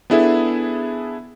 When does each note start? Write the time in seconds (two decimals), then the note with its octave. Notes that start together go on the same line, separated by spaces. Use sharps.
0.10 B3 D4 E4 G#4 A4 E5